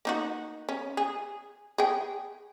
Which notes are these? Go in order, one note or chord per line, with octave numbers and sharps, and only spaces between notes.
A#3 D#4 F#4
C#4
G#4
G#4 G5